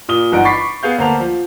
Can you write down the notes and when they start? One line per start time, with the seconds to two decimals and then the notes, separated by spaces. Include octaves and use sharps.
0.09 A#2 D#6 G7
0.32 G1 E3 D#4 F#5 D7
0.45 B5 C#6 D6 A6 B6 C7
0.83 B3 G#4 F5 G6
0.98 D2 A#3 C5 A5 F7
1.20 F3